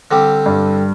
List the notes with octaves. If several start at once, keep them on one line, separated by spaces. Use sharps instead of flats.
D3 G3 C4 G4
G2